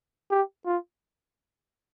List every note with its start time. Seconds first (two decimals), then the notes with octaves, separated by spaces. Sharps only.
0.31 G4
0.66 F4